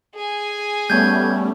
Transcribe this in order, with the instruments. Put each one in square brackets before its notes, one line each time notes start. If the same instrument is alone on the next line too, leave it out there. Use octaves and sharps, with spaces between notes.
[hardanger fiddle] G#4 G#5
[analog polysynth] G3 A3 C#4 [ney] B3 [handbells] G6 G#6